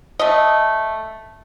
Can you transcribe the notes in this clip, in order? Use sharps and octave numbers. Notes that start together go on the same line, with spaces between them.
A3 D#5